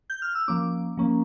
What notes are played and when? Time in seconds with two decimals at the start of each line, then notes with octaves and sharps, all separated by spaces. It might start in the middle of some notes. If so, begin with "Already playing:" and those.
0.10 G6
0.22 F6
0.35 E6
0.48 F3 A#3 C#4 D6
0.97 F3 A#3 C#4